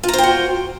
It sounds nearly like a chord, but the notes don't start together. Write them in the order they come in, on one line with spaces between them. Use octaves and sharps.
F4 A#5 C5 G5 F#4